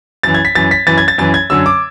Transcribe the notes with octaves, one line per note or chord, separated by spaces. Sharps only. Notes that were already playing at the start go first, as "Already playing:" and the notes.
F#2 E3 A6
G#6
B6
F#2 E3 A6
B6
F#2 E3 A6
G#6
A6
F#2 E3 A6
G#6
F#2 D3 F#3 E6
D6